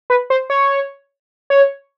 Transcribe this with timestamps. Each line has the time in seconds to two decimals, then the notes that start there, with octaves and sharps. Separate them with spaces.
0.10 B4
0.30 C5
0.50 C#5
1.50 C#5